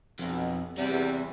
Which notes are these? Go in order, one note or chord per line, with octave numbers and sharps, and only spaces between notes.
B1 F2 B2
E2 C3 G3